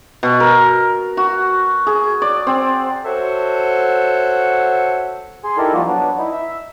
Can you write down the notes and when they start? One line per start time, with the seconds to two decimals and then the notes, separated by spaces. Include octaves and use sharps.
0.23 B2
0.40 A#4
1.17 F#4
1.87 G#4
2.22 D5
2.47 C4
3.05 F#4 A4 C5 C#5 E5 F#5
5.44 G#4 G#5 C6
5.58 D#4 E4 G4 A4 A#4 D5
5.74 F3 G3 A#3 F4 F#4
5.86 F#3 B3 D4
6.18 D#4 E4
6.31 E5